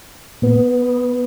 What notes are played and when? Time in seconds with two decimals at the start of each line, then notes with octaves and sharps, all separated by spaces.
0.42 A#2 B3